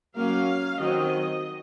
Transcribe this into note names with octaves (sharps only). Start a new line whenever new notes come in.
F#3 A#3 C#4 F5
D#3 F#3 C4 D#5